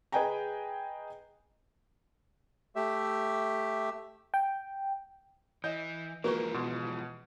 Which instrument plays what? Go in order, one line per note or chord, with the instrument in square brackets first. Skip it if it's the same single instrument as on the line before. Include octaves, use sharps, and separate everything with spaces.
[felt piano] G#4 B4 D#5 G5 G#5 A#5
[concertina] A3 G4 E5
[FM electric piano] G5
[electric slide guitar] E3 [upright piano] D#5 [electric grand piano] G6
[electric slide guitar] E3 F3 G#3 [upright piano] A#3 [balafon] F#4 B4 C#6
[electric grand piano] B2 [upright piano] C6